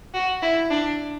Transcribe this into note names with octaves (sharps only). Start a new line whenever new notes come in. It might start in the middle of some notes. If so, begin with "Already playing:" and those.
F#4
E4
D4